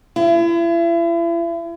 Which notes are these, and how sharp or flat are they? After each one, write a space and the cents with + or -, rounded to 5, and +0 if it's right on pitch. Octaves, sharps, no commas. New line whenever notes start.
E4 +40